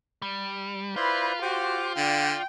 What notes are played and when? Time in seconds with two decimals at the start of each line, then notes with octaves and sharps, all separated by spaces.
0.22 G3
0.96 E4 F4 B4 C5 D5
1.42 F#4 G4 C5 D6
1.97 D3 D5 F5 G5